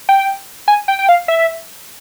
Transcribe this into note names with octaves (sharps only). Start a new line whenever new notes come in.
G5
G#5
G5
G5
F5
E5